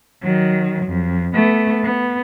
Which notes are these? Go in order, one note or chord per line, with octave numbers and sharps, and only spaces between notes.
D#3 F#3
F2
A3 B3
B3